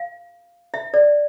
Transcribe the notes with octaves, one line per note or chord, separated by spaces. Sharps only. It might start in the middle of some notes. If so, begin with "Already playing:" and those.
Already playing: F5
E5
D5